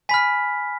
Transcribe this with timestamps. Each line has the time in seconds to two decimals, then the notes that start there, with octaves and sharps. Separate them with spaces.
0.09 G#5 B5 F6 B6